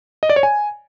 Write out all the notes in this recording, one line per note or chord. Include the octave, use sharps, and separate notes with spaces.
D#5
D5
C#5
G#5